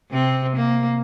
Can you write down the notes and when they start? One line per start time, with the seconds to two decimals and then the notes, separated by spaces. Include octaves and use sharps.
0.11 C3 C4
0.56 A#3